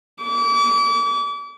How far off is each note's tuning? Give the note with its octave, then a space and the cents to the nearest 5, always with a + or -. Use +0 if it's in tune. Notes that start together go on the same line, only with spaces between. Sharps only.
D6 -40